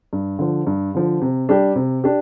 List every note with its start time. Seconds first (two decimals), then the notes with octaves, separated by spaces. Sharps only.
0.13 G2
0.39 D3 F3
0.67 G2
0.95 D3 F3
1.22 C3
1.49 G3 D4 G4
1.76 C3
2.04 D4 G4